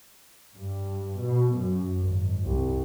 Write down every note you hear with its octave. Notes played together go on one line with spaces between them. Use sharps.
G2
B2
F#2
G#1
C2